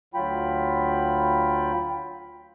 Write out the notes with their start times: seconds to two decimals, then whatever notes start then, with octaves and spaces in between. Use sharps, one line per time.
0.14 D2 F#3 F4 G5 B5